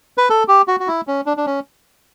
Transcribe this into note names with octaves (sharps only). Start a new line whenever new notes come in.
B4
A4
G4
F#4
F#4
E4
C#4
D4
D4
C#4